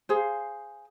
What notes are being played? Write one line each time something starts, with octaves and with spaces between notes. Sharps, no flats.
G#4 C5 F5